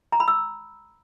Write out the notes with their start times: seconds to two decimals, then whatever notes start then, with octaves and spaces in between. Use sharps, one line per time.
0.12 A#5
0.20 B5
0.28 E6